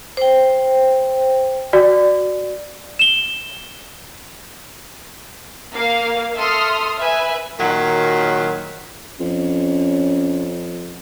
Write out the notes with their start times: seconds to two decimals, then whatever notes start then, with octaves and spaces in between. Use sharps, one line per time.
0.17 C5 G5
1.73 F#4 D5
2.99 E7 G7
5.73 A#3 F5
6.36 A4 E5 C6 D#6 F6
6.99 B4 E5 G#5
7.59 A#2 D#3 F#3
9.20 F2 C#4